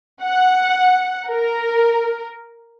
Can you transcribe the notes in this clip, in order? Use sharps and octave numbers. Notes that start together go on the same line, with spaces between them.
F#5
A#4